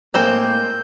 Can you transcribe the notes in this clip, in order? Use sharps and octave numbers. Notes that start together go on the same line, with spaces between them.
A2 G#3 A#3 C4 C5 G6